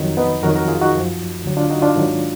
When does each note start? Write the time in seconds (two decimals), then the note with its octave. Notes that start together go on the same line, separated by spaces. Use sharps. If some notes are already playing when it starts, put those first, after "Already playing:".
Already playing: F2 D#3 F#3
0.17 B3 D#4
0.43 F2 D#3 F#3 F#4 A#4
0.56 F#4 A#4
0.68 F4 G#4
0.81 D#4 F#4
0.94 F#2 F3
1.44 D2 D3 F#3
1.57 D4 F4
1.70 D#4 F#4
1.82 D4 F4
1.96 G#2 D#3 F#3